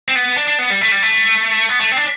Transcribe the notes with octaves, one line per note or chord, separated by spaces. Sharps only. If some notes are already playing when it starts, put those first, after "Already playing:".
C4
B3
D4
D4
B3
G3
A3
G3
A3
B3
A3
C4
D4